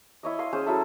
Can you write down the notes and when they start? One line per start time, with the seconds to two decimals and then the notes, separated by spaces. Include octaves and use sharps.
0.23 E4 C#5 D#5
0.39 D#5 F5 C6
0.53 C#4 G#4 C5
0.66 F#3 E4 A4